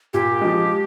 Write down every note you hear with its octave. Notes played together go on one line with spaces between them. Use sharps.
A#2 G4
F3 G#3